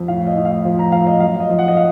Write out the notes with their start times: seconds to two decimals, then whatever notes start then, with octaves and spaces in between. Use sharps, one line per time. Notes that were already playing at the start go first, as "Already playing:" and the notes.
Already playing: F2
0.08 A2 F5
0.27 D#5
0.36 A2
0.45 F5
0.65 F3
0.79 A#5
0.92 F3 F5
1.07 D#5
1.20 F#2 F5
1.40 D#5
1.50 F3
1.59 F#5
1.68 D#5
1.77 F5